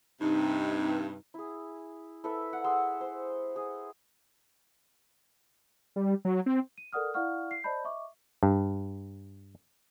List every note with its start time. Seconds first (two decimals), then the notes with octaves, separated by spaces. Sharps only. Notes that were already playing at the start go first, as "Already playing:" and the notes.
0.21 G2 C3 D#4
1.34 E4 G#4
2.24 E4 A4 B4 E5
2.53 F#5
2.64 G#4 C6 E6
3.01 C5
3.56 G#4
5.96 G3
6.25 F#3
6.46 C4
6.78 D#7
6.93 A4 A#4 D5 F#5 D#6 F6
7.14 E4 D5 F5 F#5 C#6 F6
7.51 C7
7.64 C5 D5 D#5 A5 B5 G6
7.84 D#5 E5 C#6 D6
8.43 G2